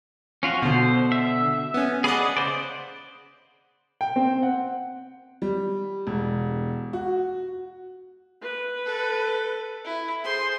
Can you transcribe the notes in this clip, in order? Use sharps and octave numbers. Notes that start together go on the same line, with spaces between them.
C#4 F4 F#4
B2 D3 C5
E5
B3 C#4
G#4 D5 D#5 F#5 B5
C#3 C5 D5
G5
C4
F#5
G3
E1
F#4
B4
A4
E4
G#4 C5 C6